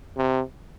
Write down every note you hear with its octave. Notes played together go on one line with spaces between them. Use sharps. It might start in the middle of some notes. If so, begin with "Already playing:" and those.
C3